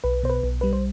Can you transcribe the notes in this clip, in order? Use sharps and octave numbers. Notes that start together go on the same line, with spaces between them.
B1 B4
B2 C5
B4
B1
G3 B4
C5